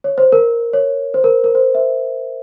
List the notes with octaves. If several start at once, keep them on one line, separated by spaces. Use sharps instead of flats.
C#5
C5
A#4
C#5
C5
A#4
A#4
C5
C5 E5